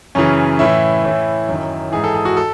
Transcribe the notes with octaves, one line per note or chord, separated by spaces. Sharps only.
F#2 C#3 E3 C#4
A2 E3 E4
A2 E3
F#2 D#3
G#2 E3 G#4
A4
G#4
F#4
A4